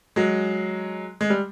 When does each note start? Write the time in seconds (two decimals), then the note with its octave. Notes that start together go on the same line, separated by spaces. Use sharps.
0.16 F#3 G#3
1.21 G#3
1.30 G3